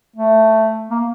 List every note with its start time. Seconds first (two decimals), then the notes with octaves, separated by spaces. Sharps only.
0.16 A3
0.91 A#3